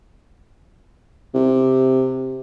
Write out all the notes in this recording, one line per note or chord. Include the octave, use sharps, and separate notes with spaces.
C3